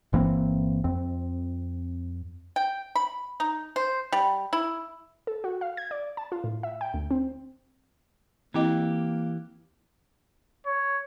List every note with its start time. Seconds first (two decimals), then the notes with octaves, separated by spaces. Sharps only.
0.13 G1 E3 A#3 C4
0.84 F2 C4
2.56 G5
2.95 B5
3.40 D#4
3.76 C5
4.12 G3
4.53 E4
5.27 A4
5.44 F#4
5.61 F5
5.77 G#6
5.91 D5
6.17 A5
6.32 F4
6.44 A2
6.63 E5
6.81 G5
6.94 D2
7.11 C4
8.54 E3 A#3 C4 E4 G4 D#5
10.66 C#5